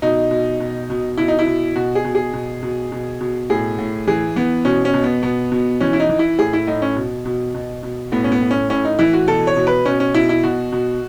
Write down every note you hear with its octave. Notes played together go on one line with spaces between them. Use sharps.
B2 D#4
B2
B2
B2
B2 E4
D#4
E4
B2
B2 F#4
G#4
B2
G#4
B2
B2
B2
B2
A2 G#4
A2
E3 G#4
E3 B3
B2 C#4
C#4
B2
B3
B2 B3
B2
E3 C#4
E4
D#4
E3
E4
A2 G#4
E4
A2 D#4
C#4
B2
B2
B2
B2
A2 B3
C#4
B3
A2
C#4
A2 C#4
D#4
E3 E4
F#4
B2 A4
C#5
B2
B4
B2 C#4
C#4
B2 E4
E4
B2 F#4
B2